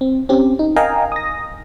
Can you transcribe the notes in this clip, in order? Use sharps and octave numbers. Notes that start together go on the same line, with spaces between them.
C4
C4 C#4 G4
D#4
A#4 D#5 F5 G5 G#5 A#5
D#6 A#6